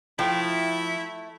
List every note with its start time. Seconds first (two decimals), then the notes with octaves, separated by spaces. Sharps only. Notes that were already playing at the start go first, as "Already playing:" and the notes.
0.19 F3 A3 E4 G5